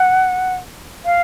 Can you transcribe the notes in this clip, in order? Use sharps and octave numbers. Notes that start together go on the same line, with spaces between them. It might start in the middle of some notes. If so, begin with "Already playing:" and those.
Already playing: F#5
F5